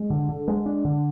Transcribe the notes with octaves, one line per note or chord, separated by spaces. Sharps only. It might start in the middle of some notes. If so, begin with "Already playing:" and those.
Already playing: G#3
D3
D3
G#3
D4
D3